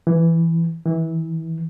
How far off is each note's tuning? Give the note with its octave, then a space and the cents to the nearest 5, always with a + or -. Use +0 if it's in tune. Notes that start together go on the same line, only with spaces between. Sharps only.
E3 +5
E3 -25